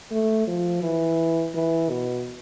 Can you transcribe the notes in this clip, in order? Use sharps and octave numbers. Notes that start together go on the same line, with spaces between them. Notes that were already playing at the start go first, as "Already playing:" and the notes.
A3
F3
E3
E3
B2